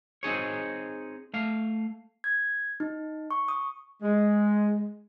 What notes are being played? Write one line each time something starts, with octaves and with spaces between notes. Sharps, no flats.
C4 D#4 G#4 C#5
A3 F5
G#6
D#4
C#6
D#6
G#3